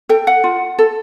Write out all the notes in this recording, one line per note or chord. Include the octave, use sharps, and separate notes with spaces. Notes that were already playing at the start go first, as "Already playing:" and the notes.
A4 G5
F#5
F4
A4